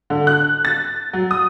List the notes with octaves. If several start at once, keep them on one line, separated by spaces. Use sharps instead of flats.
D3
F#6
A6
F#3
D#6